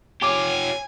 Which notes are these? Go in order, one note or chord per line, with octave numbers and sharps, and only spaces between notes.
F4 G4 C#5 G#5 D6